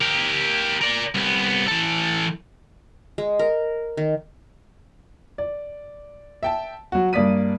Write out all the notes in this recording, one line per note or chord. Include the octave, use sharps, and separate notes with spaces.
G4 A#4
A#4 D5
C2 B3
E3 A4
G#3
A#4
D#3
D5
E5 G5 A5
F#3 F#4
G2 A#3 D5 D#6 B6 D#7